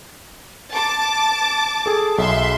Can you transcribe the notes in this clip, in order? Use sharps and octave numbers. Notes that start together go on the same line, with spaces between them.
A5 D6
G#4 A4
B1 E5 C6